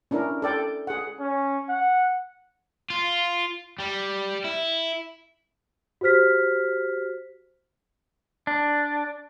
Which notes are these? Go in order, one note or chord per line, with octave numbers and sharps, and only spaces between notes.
C#4 D4 E4 A#4
A4 D5 G5
G#4 F#5
C#4
F#5
F4
G3
E4
F#4 G4 C5 F6 B6
D4